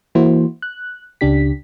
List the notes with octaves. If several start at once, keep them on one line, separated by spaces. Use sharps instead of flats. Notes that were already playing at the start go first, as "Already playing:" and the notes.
E3 A#3 E4 F#4 C5
F#6
C#2 C#3 D4 G4 B6